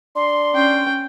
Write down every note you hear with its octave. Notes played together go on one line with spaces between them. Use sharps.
D4 C6
C#4 G5